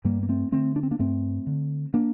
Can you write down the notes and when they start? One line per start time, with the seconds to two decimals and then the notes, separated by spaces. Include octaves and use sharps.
0.05 G2 G3 A#3
0.23 A#3
0.29 A3 C4
0.52 D3 A3 C4
0.76 D4
0.83 C4
0.91 A#3 D4
0.99 G2 A3 C4
1.47 D3
1.94 A#3 D4